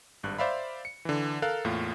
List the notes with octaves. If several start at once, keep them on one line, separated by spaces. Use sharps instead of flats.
G#1 G2 F#6
C5 D5 E5 F5 B5
C#7
D3 E3
A4 A#4 F5 F#6
E2 A2 A#3 F4